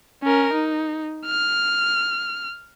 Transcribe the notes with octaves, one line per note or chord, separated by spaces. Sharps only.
C#4 A#4
D#4
F6